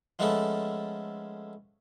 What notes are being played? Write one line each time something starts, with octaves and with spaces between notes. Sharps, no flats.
F3 G#3 A3 B3 C#4 A4